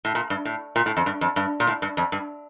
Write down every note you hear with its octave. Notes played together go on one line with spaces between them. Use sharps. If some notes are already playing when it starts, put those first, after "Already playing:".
A2
A#2
G2
A2
A#2
A2
F2
G2
F2
G2
A#2
A2
G2
F2
G2